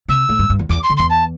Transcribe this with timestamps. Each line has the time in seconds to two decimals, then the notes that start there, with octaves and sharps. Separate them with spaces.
0.08 C3 E6
0.29 A2
0.39 G2
0.50 G2
0.59 E2
0.69 E2 D6
0.83 C6
0.90 D3
0.97 E2 C6
1.10 A5